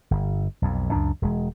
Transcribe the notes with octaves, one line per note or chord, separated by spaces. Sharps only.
G1
B1 F2
C#2 F#2 D4
E1 G#3